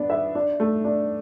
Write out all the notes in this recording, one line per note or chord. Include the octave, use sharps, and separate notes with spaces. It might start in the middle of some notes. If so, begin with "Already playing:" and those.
Already playing: B3 D4
E5
D4
A3
D4